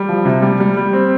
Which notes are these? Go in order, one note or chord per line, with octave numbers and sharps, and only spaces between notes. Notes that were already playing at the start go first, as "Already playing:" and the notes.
Already playing: G3
F3
C3
G3
G3
G3
C4